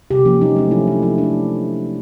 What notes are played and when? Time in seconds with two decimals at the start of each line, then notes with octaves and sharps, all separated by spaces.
0.11 C3 G4
0.26 F3 A#3 C#4
0.41 F#3 D#4
0.56 A3 C#4
0.71 F3 E4
0.87 A3 D4
1.02 F3 E4
1.18 A3 D4